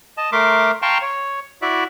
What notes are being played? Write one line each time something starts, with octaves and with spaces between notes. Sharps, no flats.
D#5 A5
A3 A#4 E5 C6 D6
F5 G5 A5 A#5 C6 C#6
C#5
E4 F#4 D5 E5